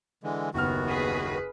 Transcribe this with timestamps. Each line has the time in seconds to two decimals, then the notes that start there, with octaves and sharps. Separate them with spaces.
0.24 D3 E3 G#3
0.54 F#1 D#2 D#3 B3 F#4 F6
0.88 G#4 B4